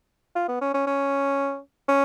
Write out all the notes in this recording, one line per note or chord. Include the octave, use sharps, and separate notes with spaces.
F4
B3
C#4
C#4
C#4
C#4